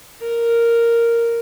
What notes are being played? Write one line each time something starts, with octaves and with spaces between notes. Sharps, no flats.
A#4